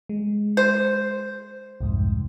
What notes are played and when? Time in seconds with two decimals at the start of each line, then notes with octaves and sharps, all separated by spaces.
0.09 G#3
0.57 C5
1.81 C2 F2 G#2